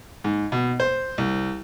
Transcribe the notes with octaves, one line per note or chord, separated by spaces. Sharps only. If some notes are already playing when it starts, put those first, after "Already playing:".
G#2
B2
C5
C2